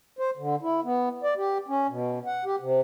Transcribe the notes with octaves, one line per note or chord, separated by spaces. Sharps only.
C5
D3
E4
B3
D5
G4
C#4
B2
F#5
G4
C3